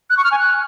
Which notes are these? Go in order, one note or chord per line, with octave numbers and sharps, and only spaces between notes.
F#6
C#6
F6
G#5
F#6